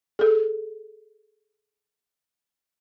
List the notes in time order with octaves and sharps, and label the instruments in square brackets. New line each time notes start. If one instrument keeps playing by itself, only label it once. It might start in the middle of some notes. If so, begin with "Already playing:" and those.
[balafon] G#4 A4